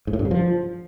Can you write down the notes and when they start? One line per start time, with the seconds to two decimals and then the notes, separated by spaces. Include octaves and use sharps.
0.07 G#2
0.13 A2
0.19 G2
0.25 C#3
0.31 F3